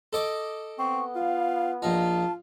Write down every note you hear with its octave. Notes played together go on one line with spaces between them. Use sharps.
A4 D#5 D6
B3 C4 C#6
F4 F5
A#1 D#4 F4 A5